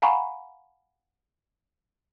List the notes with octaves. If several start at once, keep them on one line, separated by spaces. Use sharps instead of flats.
F5 F#5 G#5 A#5 B5 C#6